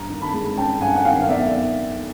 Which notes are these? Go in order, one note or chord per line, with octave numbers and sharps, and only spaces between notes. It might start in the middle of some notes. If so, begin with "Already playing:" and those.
Already playing: G2 A#5
D#3
A5 B5
G#3
C#4 G5 A5
G2 F#5 G#5
F#5
D#3 F5 G5
F5
B1 D5 E5